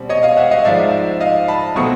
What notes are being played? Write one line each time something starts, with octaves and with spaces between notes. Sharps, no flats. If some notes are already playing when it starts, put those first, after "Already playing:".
Already playing: B2 G3 C4
C#5 D#5
D#5 F5
E5 F#5
D#5 F5
G#2 F3 G#3 D5 E5
D#5 F5
A5 B5
B2 F#3 A3 C4 C#6 D#6